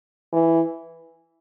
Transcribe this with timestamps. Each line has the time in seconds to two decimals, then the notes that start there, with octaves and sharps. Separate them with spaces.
0.33 E3